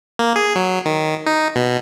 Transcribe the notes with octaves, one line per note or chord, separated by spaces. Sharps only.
A#3
G#4
F#3
D#3
D#4
B2